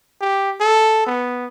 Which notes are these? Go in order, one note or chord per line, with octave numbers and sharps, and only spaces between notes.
G4
A4
B3